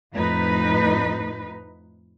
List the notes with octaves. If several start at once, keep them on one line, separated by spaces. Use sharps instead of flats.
F2 A2 D#4 B4